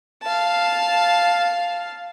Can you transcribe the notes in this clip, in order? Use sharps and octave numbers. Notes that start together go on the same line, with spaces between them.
F5 A5